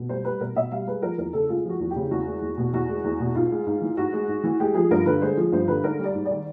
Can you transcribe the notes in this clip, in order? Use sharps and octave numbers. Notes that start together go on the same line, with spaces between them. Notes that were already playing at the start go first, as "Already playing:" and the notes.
Already playing: B2
G3 C5
G3 B4
B2 A#4
B2 E5
G3 F5
G#3 B4
F3 A#4
E2 A#4
C#3 A4
G#3 F4
F3 F#4
E2
G4
C#3
E2 F#4
G#3
E2
B2
E2 F#4
G#3
E2
B2
G#2 F4
G#3
G#2
E3
G#2 F#4
G#3
G#2
E3
G#3 G4
F3 G#4
G2 A#4
D3 B4
G#3 C5
F3
G2 C5
D3 B4
G#2 A#4
G3
D5
G#2
D#3 D5